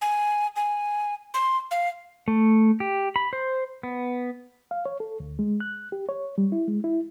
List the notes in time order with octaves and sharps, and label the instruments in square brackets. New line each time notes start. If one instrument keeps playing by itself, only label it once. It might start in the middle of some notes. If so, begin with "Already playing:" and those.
[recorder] G#5
G#5
C6
F5
[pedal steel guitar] A3
G4
B5
C5
B3
[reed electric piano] F5
C#5
A4
D2
G#3
F#6
G4
C#5
G3
E4
G#3
E4